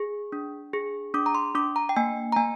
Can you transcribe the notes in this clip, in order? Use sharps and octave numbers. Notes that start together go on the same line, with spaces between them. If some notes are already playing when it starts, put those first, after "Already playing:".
Already playing: G#4
D4
G#4
D4 D6
A#5
C6
D4 D6
A#5
G5
A#3 G#5
A#5
A#3 G#5